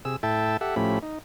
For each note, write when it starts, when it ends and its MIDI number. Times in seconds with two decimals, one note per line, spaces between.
0.05 0.16 48
0.05 0.16 68
0.05 0.16 88
0.23 0.57 45
0.23 0.57 64
0.23 0.57 69
0.23 0.57 76
0.23 0.57 79
0.23 0.57 81
0.61 0.75 67
0.61 0.75 69
0.61 0.75 76
0.61 0.75 78
0.76 0.99 45
0.76 0.99 53
0.76 0.99 57
0.76 0.99 61
0.76 0.99 67
0.76 0.99 83
1.03 1.19 63